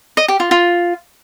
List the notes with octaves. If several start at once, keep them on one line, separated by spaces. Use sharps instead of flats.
D#5
G4
F4
F4